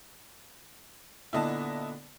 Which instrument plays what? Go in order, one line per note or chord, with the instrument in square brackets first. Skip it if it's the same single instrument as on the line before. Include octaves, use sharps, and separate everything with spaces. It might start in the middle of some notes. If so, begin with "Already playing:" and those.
[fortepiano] A#2 D3 B3 [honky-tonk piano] E4 D#5 A5